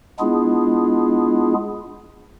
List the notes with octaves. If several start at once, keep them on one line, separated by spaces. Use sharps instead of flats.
G#3 B3 D4 E4 F4 G#4